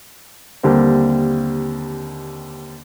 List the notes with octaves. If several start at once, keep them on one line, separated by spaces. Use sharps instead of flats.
D#2 D3 G3 A#3 C4